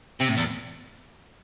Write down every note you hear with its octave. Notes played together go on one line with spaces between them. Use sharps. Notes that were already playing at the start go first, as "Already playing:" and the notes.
C3
A2
E2